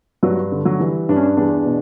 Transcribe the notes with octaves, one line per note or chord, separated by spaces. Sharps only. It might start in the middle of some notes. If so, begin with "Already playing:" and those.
G2 F#3 F#4
D3
F#3 F#4
E3 G3 E4
G2 D4
C#4
D4
E2 D4
B2